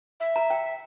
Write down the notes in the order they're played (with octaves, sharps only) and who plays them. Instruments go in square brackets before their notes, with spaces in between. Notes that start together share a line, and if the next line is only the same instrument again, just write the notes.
[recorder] E5
[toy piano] A#5
G5